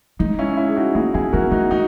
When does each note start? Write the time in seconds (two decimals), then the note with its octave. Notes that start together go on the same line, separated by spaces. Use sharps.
0.19 G#3 D#4
0.39 C#4 E4
0.57 C#4 E4
0.68 G#4
0.76 D#4 F#4
0.95 A#3 E4 G#4
1.14 B3 E4 G#4
1.33 B3 F#4 A#4
1.51 B3 D#4 F#4
1.71 G#3 D#4 F#4